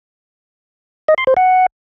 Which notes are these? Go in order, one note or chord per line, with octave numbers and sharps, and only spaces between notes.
D#5
C6
C5
F#5